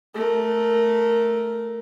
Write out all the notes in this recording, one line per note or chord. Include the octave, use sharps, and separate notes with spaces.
A3 A#4